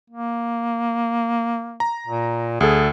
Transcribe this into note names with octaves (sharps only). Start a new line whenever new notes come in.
A#3
A#5
A#2
D2 G#4 A4